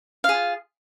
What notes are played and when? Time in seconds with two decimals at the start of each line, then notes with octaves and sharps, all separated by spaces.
0.24 F5
0.29 G#4
0.34 F4